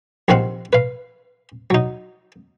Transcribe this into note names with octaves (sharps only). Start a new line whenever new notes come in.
A#1 C3 D#3 C4 F5 F#5
B4 F5
F#3 D#4